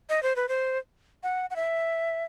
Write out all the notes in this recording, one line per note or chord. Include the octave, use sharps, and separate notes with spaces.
D#5
C5
B4
C5
F#5
F#5
E5